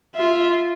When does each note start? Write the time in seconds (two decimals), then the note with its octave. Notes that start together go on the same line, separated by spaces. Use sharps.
0.16 F4 E5